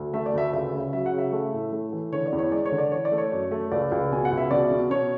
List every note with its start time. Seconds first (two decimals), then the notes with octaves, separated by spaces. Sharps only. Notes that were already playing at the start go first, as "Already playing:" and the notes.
Already playing: D2
0.14 A3 E5
0.26 D5
0.34 D2 E5
0.53 C#2 E5
0.73 C#3
0.93 F#3 E5
1.06 F#5
1.13 C#3
1.18 E5
1.32 A3
1.53 A2
1.72 A3
1.93 E3
2.12 D3 C#5
2.26 D5
2.32 E2
2.39 C#5
2.52 G#3 D5
2.65 C#5
2.72 D3
2.78 D5
2.92 E3 C#5
3.05 D5
3.12 A3
3.18 C#5
3.32 F#2
3.51 A3
3.72 C#2 D5
3.92 C#2
4.12 B2 G#5
4.25 F#5
4.31 C#2
4.38 E5
4.51 B2 D5
4.71 B2
4.90 B2 C#5